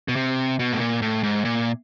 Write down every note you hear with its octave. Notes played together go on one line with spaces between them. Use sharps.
B2
C3
B2
A2
A#2
A2
G#2
A#2